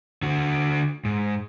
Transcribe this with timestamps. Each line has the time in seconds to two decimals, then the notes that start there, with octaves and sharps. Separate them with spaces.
0.23 D3 F#4
1.05 G#2